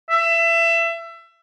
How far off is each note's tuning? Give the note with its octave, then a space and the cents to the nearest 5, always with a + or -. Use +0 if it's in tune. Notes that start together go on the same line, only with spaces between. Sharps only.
E5 +25